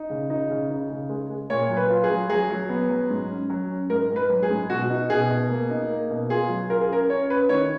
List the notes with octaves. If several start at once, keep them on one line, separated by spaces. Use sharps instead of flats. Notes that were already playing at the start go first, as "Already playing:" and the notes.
Already playing: D#4
C#3
D#4
C#3
D#4
C#3
G#3
G#3
A#2 C#5
F#3
B4
F4
G#4
F#3
F#3 G#4
F#3
B3
F#3
G#2
C#4
F#3
C#4
G#2 A#4
G#2
B4
F#3
G#4
G#2
B2 F#4
D#4
B2 G#4
B2
A#3
D#4
A#3
B2
F4 G#4
F#3
F4 A#4
G#4
C#4 A#4
C#4 C#5
C#4 B4
D#3 C#5